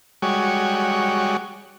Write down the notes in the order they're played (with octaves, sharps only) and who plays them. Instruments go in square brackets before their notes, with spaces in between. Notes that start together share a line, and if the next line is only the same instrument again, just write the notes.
[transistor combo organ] G3 G#3 F#4 C#5